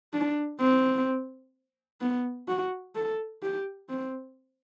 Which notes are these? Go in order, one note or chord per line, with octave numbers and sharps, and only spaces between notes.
D4
C4
B3
F#4
A4
G4
C4